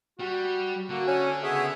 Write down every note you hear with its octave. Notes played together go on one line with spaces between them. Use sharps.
G3 F#4
D3 A#3 F#4
C#4 G#5
C#3 B3 G#4 C#5 E5